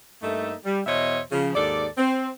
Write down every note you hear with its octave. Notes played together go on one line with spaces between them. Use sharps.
G2 A3 A#3 D#4 A4 E5
G3
E2 B2 C5 C#5 D#5 E5
C#3 F3
D#2 G#2 A4 D5
C4